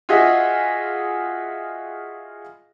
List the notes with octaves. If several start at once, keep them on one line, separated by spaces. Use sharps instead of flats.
F4 F#4 G#4 D#5 E5